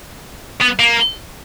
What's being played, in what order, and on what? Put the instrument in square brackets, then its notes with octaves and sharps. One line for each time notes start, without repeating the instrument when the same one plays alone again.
[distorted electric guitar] B3
A#3